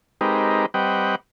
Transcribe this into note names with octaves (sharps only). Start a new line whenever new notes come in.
G#3 C4 D#4 G4 A#4 B4
G3 C4 B4 D#5 F#5 G5